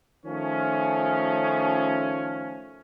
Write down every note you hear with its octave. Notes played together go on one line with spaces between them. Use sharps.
D#3 F3 A3 C#4